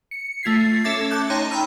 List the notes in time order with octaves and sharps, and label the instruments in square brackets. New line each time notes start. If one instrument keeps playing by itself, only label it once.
[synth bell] C#7
A3 F4 G#6 B6 C7
C#4 A4 E5 D6 G#6 A#6
A5 D6 F#6 G6
D#4 C#5 G5 A5 A#5 C6
G5 A#5 B5 E6 F6